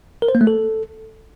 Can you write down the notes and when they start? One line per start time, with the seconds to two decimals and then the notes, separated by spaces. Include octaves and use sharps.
0.22 A#4
0.28 C5
0.35 A#3
0.41 A3
0.47 A4